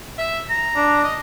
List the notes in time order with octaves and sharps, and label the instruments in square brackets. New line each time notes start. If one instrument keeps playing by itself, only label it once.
[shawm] E5
A#5
[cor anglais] D4
[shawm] D#5